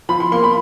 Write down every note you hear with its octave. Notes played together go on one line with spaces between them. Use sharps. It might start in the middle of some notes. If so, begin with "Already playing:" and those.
F3 B5
C6
A#3 C6
B5